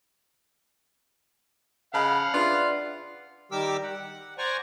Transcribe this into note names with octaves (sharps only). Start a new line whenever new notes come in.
C#3 D#5 F5 F#5 A5 B5
D4 F4 G#4 B4 D5 E5
D#3 G3 G4 A#4 D6 E6
F#5
C5 D5 F#5 G#5 A#5 C#6